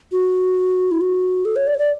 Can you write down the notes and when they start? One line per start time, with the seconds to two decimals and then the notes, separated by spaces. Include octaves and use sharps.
0.12 F#4
0.91 E4
1.01 F#4
1.45 A4
1.56 C#5
1.67 D5
1.75 C#5
1.78 D5